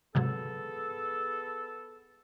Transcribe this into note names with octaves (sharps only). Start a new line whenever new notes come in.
G#2 C3 F#3 B3 G#4 A4